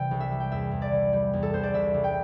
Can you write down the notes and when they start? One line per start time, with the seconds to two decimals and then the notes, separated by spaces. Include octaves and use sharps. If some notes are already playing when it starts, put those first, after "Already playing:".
Already playing: C3 E3 G3 G5
0.11 C2
0.20 E5
0.31 G3
0.40 G5
0.52 E2 E5
0.71 E2
0.82 D5
0.92 E3
1.13 G3
1.33 E2
1.43 A4
1.53 E2 C5
1.63 D5
1.74 C2 E5
1.94 C2
2.04 G5